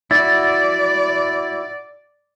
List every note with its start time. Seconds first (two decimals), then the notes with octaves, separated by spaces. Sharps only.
0.11 E4 F#4 D5 A6